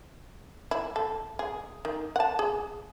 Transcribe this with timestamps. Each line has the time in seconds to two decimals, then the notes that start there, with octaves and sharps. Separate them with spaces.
0.71 E4
0.96 A4
1.39 G#4
1.85 D#3
2.16 F#5 A5
2.39 G#4